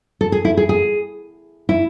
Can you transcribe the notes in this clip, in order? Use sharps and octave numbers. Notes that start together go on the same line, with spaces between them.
A4
G#4
E4
G#4
G#4
E4